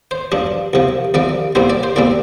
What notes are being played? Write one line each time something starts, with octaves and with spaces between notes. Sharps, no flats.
C5
G2 F3 D4
C2 C3 F3
C2 C3 F3 D5
C2 A#2 G3 C4 C5
D5
C5
C2 A#2 G3 C4 D5